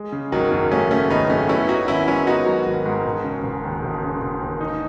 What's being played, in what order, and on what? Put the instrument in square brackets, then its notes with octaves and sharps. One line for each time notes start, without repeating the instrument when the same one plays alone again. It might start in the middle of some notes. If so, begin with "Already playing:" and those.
Already playing: [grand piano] G#3
C#3
[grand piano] G#1 [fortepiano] D#3 F#3
[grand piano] F#2
[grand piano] G#3 [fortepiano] A3 C#4
[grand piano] C#3 [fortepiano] A3 C#4
[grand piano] G#1 [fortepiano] B3 D#4
[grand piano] F#2 [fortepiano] A3 C#4
[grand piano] B3 [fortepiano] C#4 E4
[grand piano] F#3 [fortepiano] D#4 F#4
[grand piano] G#1 [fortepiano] C#4 E4
[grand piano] G#2 [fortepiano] C#4 E4
[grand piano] B3 [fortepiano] D#4 F#4
[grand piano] F#3
G#1
G#2
E1
C#3
E1
D#2
E1
C#3
E1
D#2
D#4